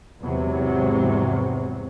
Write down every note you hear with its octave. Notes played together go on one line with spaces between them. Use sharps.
E2 G#2 C3 F#3